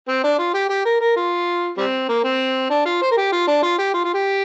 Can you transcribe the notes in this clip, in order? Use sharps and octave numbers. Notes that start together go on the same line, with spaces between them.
C4
D4
F4
G4
G4
A#4
A#4
F4
G3 C4
A#3
C4
D4
F4
C5
A#4
G4
F4
D4
F4
G4
F4
F4
G4